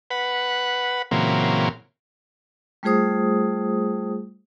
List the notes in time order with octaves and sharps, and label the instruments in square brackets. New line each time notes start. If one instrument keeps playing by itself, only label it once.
[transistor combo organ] B4 F#5
A#2 C#3 E3 F#3 A#3 C4
[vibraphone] G3 A3 F4 G#4 C5 D#6